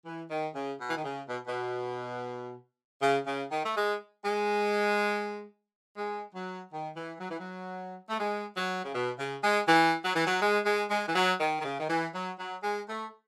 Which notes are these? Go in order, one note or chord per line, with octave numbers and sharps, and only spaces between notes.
E3
D#3
C#3
B2
E3
D#3
C#3
B2
B2
C#3
C#3
D#3
A3
G#3
G#3
G#3
F#3
D#3
E3
F#3
E3
F#3
A3
G#3
F#3
C#3
B2
C#3
G#3
E3
F#3
E3
F#3
G#3
G#3
G#3
E3
F#3
D#3
D#3
C#3
D#3
E3
F#3
F#3
G#3
A3